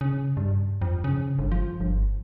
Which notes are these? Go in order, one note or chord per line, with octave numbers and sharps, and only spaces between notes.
C#3
G2
F2
C#3
G1
F3
G1